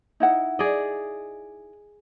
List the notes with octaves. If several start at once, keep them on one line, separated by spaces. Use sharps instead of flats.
D#4 E4 F#5
G#4 D5 D#5